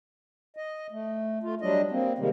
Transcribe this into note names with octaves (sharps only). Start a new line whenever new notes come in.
D#5
A3
A3 F4
F#3 G3 D4 D#5
A#3 C4
C3 D#3 G3 G#3 A#3